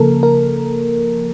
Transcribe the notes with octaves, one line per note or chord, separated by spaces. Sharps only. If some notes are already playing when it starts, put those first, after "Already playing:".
Already playing: C#3 F3 A#3 A4 A#4
A#4